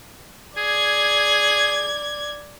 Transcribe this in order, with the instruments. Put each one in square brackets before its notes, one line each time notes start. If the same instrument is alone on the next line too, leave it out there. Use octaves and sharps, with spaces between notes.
[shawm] G#4 [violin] D5 G#6